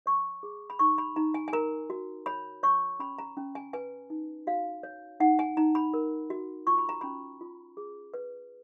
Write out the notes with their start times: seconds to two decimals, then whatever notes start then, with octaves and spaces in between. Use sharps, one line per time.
0.06 C#5 C#6
0.43 G#4
0.70 B5
0.79 D#4 C#6
0.98 B5
1.16 D#4 A#5
1.34 G#5
1.48 G#5
1.53 A#4 A#5
1.90 F#4
2.26 C#5 B5
2.63 C#5 C#6
2.99 C#4 B5
3.18 A#5
3.37 C#4
3.55 G#5
3.73 B4 G#5
4.10 D#4
4.47 F#4 F5
4.83 C#5
5.20 D#4 F#5
5.39 G#5
5.57 D#4 A#5
5.75 B5
5.94 A#4
6.30 F#4
6.67 F4 C#6
6.78 B5
6.89 A#5
7.01 C#4 B5
7.41 F4
7.77 G#4
8.14 B4